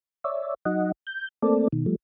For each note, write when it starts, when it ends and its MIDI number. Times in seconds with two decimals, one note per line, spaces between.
0.24 0.54 73
0.24 0.54 74
0.24 0.54 76
0.65 0.92 54
0.65 0.92 63
0.65 0.92 75
0.65 0.92 78
1.07 1.28 91
1.43 1.68 57
1.43 1.68 58
1.43 1.68 60
1.43 1.68 69
1.43 1.68 74
1.73 1.86 47
1.73 1.86 51
1.86 1.96 53
1.86 1.96 55
1.86 1.96 57